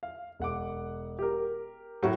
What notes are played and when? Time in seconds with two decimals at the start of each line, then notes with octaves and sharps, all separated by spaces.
0.03 F5
0.39 E1 F#5 D6
1.19 G4 A#4
2.03 A2 F#3 F#4